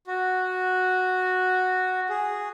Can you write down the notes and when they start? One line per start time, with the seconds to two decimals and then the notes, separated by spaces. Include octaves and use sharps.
0.07 F#4
2.09 G#4